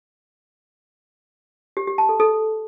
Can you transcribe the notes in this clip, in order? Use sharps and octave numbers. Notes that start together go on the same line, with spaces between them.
G4
G4
A5
A4
A4